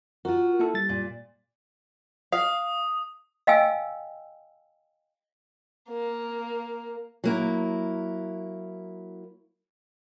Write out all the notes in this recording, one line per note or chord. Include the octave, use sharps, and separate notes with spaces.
F4 F#4 A#4
A#3 E4 A4
G3 A6
A#2
F5 D#6
D#5 F5 G5 G#5 E6
A#3
F#3 A#3 E4